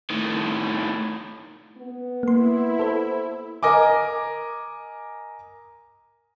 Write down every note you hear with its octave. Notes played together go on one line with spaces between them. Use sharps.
A2 D#3
B3
A#3 E4 C6
A4 C5
A#4 D#5 G#5 D6